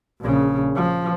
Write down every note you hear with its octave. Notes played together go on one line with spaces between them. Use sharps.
A#1 C#3
F3